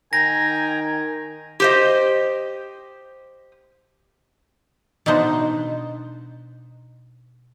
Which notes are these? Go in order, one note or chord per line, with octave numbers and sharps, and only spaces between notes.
D#3 G5 G#5 A#5 A#6
G4 C5 D#5
B2 D4 D#4 C5 F#5